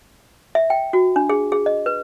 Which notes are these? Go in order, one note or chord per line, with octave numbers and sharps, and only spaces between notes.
E5
G5
F#4
D4
G#4
G#4
D#5
B4